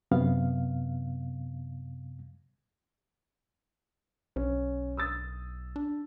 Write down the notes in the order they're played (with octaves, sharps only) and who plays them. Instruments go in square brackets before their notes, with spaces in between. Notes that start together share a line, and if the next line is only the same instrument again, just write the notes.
[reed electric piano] F#2 C3 B3 F5
[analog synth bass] B1 [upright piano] C#4
[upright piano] D#6 E6 A6
[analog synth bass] D4